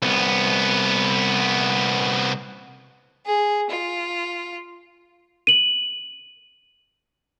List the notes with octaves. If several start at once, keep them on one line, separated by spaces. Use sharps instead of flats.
C2 B3
G#4
F4
D#7 F#7